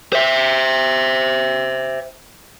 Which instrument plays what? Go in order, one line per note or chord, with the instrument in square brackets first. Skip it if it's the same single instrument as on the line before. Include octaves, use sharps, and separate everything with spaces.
[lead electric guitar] C5 E5